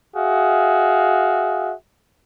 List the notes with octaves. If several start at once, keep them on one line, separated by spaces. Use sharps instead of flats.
F#4 G#4 E5 F5